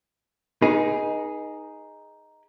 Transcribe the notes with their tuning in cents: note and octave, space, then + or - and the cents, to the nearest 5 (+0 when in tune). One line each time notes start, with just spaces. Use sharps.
D#4 +0 G#4 +0 B4 -40